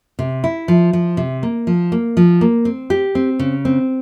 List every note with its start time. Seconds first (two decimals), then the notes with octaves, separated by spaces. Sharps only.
0.19 C3
0.44 E4
0.68 F3
0.93 F3
1.17 C3
1.43 A#3
1.67 F3
1.92 A#3
2.17 F3
2.41 A#3
2.65 C4
2.90 G4
3.15 C4
3.39 C#3
3.65 C4